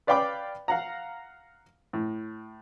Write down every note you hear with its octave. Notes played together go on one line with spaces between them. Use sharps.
B4 D5 F5 G5 B5 D6
F5 F#5 A#5
A2